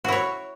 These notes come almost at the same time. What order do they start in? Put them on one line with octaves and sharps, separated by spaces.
F#4 E4 C#5